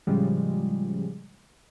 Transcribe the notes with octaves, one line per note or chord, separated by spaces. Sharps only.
A2 C#3 F3 G3 G#3